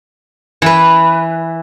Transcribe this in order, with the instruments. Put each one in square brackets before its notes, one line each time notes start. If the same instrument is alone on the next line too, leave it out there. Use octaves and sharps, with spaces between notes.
[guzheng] E3 B4